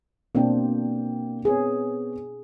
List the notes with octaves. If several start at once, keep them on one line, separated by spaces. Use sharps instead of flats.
B2 A#3 C4 D4 G5
B3 C4 G#4 C#5